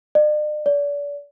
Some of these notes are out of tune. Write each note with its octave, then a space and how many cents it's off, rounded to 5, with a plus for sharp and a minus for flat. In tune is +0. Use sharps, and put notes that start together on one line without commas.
D5 +45
D5 -35